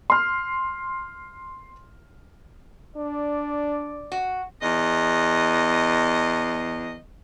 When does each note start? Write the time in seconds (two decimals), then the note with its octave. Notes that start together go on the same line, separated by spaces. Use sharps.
0.10 C6 F6
2.97 D4 D5
4.12 F#4
4.61 E2 D#5